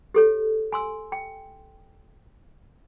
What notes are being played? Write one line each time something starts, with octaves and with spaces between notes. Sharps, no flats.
G4 A4 C#5
G#5 C6 E6
G5